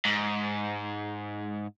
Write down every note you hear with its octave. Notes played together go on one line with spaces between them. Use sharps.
G#2